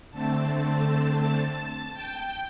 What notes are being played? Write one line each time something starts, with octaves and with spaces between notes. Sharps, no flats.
D3 A3 C4 A5
A5
G5